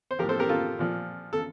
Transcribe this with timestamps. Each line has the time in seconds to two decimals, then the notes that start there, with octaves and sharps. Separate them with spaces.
0.11 C5
0.19 F3 G4 A#4
0.23 A2
0.29 A4 C5
0.39 G4 A#4
0.49 F4 A4
0.79 A#2 F3
1.33 A4